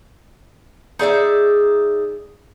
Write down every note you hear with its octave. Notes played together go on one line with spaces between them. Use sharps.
D#4 G#4 D5 E5